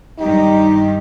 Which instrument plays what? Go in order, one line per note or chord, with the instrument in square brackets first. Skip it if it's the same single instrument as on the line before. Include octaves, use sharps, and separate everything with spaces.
[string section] G2 D#3 G4 [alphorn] D#4